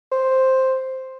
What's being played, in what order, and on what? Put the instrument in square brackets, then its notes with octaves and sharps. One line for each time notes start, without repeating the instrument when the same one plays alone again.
[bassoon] C5